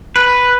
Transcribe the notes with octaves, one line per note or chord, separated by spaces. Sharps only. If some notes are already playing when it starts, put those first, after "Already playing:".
B4